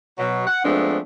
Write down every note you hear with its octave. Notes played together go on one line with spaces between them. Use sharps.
B2 F#3
F#5
F3 G#3 A3 B3 C4 D4